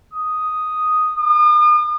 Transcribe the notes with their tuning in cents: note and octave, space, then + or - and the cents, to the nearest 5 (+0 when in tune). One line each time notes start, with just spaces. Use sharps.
D#6 +0
D#6 -45